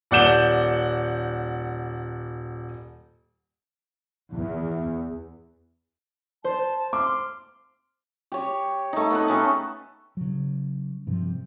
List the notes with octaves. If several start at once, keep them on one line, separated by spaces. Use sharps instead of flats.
D#1 D5 F#5 G6 E7 G7
E2
C5 A5
C6 D6 F6
G4 C#5
A3 D#4
B3 D#4 B4
A3 C#4 G4 A4
C#3 F#3
G2 C3 F3